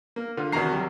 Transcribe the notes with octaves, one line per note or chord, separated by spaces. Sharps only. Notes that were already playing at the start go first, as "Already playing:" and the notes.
A#3
D3 F4
E2 C3 D#3 F#4 A#5 C7
F#3 G3